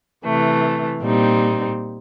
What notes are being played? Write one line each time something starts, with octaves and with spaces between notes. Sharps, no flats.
C3 E3 A3
A#2 G3 C4 D#4